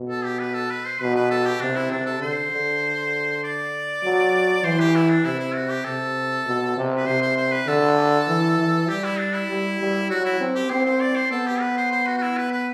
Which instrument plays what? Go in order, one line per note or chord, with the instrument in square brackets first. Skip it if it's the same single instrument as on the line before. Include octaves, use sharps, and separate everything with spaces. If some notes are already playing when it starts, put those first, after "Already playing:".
Already playing: [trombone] B2
[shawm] A4
G4
B4
A4
B4
C5
[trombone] B2 [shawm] B4
[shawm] B4
A4
G4
[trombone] C3 [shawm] D4
[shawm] E4
[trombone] C3 [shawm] D4
[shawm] A4
[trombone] D3 [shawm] C5
[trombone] D3
[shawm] D5
[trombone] F#3
[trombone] E3 [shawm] C5
[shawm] G4
E4
D4
[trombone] C3 [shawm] E4
[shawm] E4
F#4
G4
[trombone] C3 [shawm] A4
[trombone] B2
C3
[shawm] B4
[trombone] C3 [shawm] C5
[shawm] C5
C5
B4
[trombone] D3 [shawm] A4
[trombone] E3
E3
[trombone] G3 [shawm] G4
[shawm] E4
D4
E4
[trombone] G3
G3
[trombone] F#3 [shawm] F#4
[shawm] E4
[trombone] C4
[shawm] G4
[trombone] C4 [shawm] C5
[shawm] C5
D5
C5
[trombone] B3 [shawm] A4
[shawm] G4
B4
C5
C5
F#4
F#4
E4
B4
B4